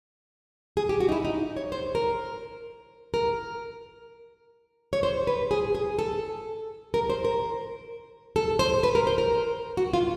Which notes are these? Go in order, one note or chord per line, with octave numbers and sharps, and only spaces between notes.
G#4
G4
F#4
D#4
E4
D#4
C#5
C5
A#4
A#4
C#5
C5
B4
G#4
G#4
A4
A#4
C5
A#4
A4
C5
B4
A#4
C5
A#4
F#4
F4